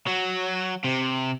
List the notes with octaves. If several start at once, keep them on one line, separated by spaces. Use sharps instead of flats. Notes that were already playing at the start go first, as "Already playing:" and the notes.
F#3
C3